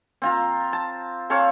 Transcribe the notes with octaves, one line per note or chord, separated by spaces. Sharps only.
C4 F4 A#5
A5
C4 A4 C#5 F5